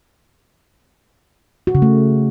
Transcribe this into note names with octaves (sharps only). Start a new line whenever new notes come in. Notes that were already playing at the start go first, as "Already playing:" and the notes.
F#4
C#3
A3